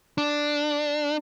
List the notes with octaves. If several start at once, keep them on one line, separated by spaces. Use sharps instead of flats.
D4